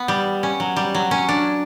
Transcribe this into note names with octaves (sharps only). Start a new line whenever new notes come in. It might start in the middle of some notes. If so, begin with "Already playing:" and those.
Already playing: B3
G3
C#4
F#3
G3
F#3
C#4
D4